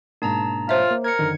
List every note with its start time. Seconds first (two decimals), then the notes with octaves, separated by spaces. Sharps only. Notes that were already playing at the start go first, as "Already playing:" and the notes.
0.22 G#2 B2 A#3 D4 A5 A#5
0.69 F4 C5 C#5 E5
0.91 A#3
1.04 A#4 G#6 C#7
1.19 F#2 D3 D#3